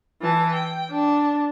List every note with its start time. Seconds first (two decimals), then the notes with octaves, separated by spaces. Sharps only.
0.22 E3 A5
0.53 G5
0.91 D4